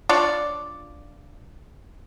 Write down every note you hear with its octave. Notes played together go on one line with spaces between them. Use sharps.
D4 F4 C#5 D5